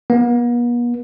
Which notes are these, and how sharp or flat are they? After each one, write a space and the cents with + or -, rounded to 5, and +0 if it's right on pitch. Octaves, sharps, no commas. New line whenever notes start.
B3 -45